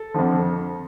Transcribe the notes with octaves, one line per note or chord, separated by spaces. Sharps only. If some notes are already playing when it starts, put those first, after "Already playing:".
Already playing: A4
F2 D3 F3